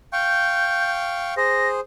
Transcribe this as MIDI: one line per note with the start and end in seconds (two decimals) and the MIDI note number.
0.13 1.34 77
0.13 1.34 79
0.13 1.34 85
0.13 0.91 91
1.37 1.80 68
1.37 1.80 72
1.37 1.68 94